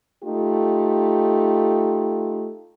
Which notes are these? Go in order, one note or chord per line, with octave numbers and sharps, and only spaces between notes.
A3 D#4 F4 G4